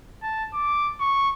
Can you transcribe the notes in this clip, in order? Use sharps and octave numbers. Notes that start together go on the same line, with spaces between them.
A5
D6
C#6